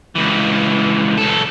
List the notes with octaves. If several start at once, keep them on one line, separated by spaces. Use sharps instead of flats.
C#2 E3
C#2 A4